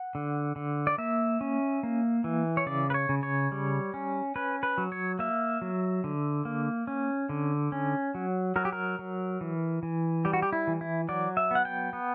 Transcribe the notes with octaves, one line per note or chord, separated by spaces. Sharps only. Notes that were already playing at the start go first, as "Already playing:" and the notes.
Already playing: F#5
D3
D3
D5
A#3 E5
C#4
A#3
E3
C#5
C#3 D5
B4
C#5
C#3
C#5
G3
C#4
C#4 B4
B4
F#3
C#5
A#3 E5
F#3
D3
A#3
C#4
D3
C#4
F#3
F#3 A#4
G4
A#4
F#3
E3
E3
G3 G4
F#4
G4
E4
E3
E4
F#3 D5
E5
B3 F#5
G5
B3